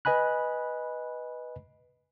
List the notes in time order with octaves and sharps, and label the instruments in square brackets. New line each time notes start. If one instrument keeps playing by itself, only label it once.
[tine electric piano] B4 D#5 G#5 B5 F#6